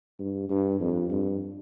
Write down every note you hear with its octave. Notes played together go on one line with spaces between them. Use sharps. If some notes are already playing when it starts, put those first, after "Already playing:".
G2
G2
F2
G2